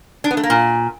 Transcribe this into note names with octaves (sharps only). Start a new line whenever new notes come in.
D4
B3
A3
A#3
A#2